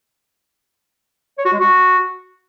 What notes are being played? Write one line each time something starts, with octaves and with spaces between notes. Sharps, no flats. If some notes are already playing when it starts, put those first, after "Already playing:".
C#5
F#4
G#3
F#4